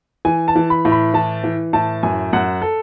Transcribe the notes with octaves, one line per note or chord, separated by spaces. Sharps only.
E3 G#5
A5
E3
B5
A2
B5
E3 A5
E3
A2 A5
F#2 G#5
F#2 F#5
A4